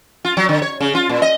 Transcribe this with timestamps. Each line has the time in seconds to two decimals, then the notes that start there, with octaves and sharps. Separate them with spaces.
0.25 F4
0.37 F#3
0.49 D3
0.62 C#5
0.80 C#3
0.95 F4
1.09 A#2
1.22 D#5